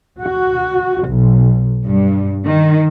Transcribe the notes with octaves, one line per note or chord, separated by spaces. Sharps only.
F#4
B1
G2
D#3